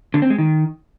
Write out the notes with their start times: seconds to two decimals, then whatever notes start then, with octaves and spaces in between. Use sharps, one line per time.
0.14 D3
0.22 C4
0.30 G#3
0.38 D#3